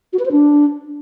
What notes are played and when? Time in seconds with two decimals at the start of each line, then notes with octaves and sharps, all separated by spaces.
0.13 F#4
0.19 B4
0.25 C5
0.32 D4